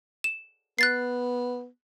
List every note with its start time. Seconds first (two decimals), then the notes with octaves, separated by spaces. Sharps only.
0.24 E7
0.79 B3 F#6 A6 C7